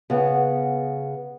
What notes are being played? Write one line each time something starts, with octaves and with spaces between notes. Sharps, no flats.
C#3 B3